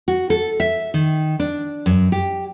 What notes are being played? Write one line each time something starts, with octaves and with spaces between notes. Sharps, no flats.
F#4
A4
E5
D#3
D4
F#2
G4